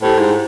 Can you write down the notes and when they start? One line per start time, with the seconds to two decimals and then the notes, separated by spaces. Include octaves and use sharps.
0.02 A2 E4 G4 C5
0.18 G#2